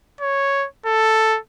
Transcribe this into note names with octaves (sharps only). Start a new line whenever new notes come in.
C#5
A4